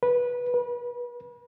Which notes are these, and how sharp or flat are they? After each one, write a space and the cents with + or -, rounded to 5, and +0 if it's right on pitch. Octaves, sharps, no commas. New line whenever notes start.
B4 -15
B4 -35